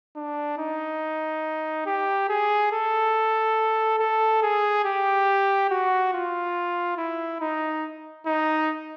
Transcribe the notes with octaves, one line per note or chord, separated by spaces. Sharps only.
D4
D#4
G4
G#4
A4
A4
G#4
G4
F#4
F4
E4
D#4
D#4